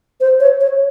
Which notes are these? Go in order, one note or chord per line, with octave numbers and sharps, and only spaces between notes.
C5
C#5
C#5